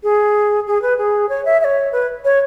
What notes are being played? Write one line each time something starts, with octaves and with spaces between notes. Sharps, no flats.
G#4
G#4
B4
G#4
C#5
E5
E5
C#5
B4
C#5